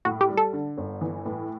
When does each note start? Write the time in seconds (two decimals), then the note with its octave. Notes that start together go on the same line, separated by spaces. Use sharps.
0.05 A2 F#4
0.21 G4
0.29 G3
0.37 A4
0.53 D3
0.77 G1
1.01 E3
1.26 A2